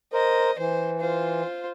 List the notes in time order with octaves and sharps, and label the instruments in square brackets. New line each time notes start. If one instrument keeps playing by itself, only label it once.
[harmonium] A#4 C5 [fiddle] D#5
[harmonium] E3 [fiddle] C5
[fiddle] F4 C5